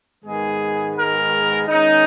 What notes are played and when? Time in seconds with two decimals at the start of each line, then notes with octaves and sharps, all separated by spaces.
0.24 G#2 D#3 G#3 B3 G#4
0.96 A#4
1.68 D#3 G#3 C#4 D#4